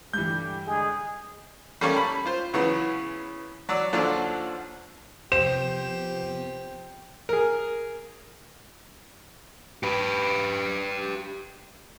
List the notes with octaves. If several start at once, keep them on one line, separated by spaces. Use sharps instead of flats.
G2 D3 E3 G4 G6
D3 G#3 G#4
G3 A3 A#3 C#4 F5 C#6
B5
F4 C5
C#3 E3 F#3 B3
F#3 D5 E6
D#2 D3 F3 F#3 F4 D5
C3 F3 B3 G4 C5 E7
G#4 A#4
G4 B4